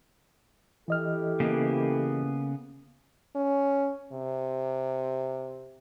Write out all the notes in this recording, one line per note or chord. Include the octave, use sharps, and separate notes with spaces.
E3 E4 G4 A4 D#5 F6
C#3 A#3 B3
C#4
C3